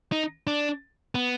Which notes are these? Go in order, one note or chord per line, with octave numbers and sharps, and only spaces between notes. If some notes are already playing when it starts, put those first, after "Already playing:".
D#4
D4
B3